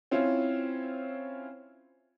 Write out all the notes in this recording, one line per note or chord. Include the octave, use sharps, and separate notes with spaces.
C4 C#4 E4 F4